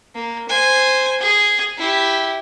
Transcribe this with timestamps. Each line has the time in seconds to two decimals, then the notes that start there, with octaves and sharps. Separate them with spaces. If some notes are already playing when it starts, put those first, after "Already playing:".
0.14 A#3
0.49 C5 G#5
1.21 G#4
1.78 E4 G4